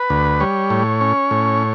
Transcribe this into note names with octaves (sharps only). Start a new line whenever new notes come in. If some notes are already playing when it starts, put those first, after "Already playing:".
Already playing: B4
D2
G3 C#5
A2
C#4
A2